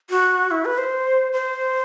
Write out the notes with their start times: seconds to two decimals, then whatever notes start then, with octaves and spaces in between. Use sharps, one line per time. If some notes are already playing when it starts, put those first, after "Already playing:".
0.10 F#4
0.51 E4
0.65 B4
0.78 C5
1.33 C5